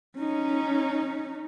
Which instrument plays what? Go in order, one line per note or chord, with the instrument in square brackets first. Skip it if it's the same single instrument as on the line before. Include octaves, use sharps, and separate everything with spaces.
[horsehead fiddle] C#4 D#4